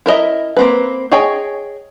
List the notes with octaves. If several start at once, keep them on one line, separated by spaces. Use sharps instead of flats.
E4 A#4 B4 D#5 E5
A#3 C4 B4
G#4 C#5 D#5 G5 G#5